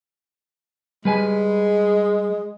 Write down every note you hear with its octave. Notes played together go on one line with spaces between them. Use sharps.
G3 G#3 B4 G#5